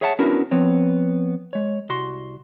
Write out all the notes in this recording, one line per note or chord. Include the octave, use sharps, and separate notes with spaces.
G#4 C#5 E5 F#5 G#5 A5
B3 C#4 D4 E4 F#4 A#4
F3 B3 C4 C#5
G#3 C#5
C2 F#4 C6